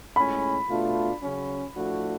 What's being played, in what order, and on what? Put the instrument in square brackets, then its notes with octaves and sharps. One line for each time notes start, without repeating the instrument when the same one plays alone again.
[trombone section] A2 G#3 C#4 [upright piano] B5
[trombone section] B2 A3 D4 F4
C#3 F#3 C#4
A2 F3 A3 D4 F#4